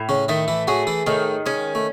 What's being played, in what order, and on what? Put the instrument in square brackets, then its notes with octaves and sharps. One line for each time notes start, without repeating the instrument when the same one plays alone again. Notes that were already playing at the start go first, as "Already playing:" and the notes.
Already playing: [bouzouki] A2
[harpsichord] C#3 C#4
[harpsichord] D#3 D#4 [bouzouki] A3
[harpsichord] E3 E4
[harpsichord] F#3 F#4 [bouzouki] G#4
[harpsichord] E3 E4
[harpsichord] A2 A3 [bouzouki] D#3
[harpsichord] G#3 [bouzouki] C#4
[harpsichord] A3